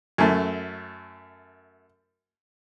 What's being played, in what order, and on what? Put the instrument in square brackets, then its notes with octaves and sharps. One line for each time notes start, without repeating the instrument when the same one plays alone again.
[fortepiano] F#2 A3